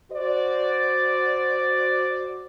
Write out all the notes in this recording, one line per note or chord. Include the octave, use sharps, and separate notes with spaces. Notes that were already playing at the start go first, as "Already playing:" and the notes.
F#4 C5 D5